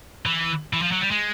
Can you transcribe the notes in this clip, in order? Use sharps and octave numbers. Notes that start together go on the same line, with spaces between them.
E3
E3
F3
F#3
G3
G#3